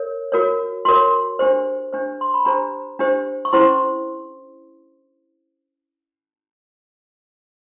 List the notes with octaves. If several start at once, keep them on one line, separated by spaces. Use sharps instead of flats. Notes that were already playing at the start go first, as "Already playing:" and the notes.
Already playing: A#4 C#5
F#4 A#4 C#5
F#4 A#4 C#5 C6
D4 G4 C5
D4 G4 C5
C6
B5
D4 G4 C5 A#5
D4 G4 C5
C#6
C#4 E4 G#4 C5 C6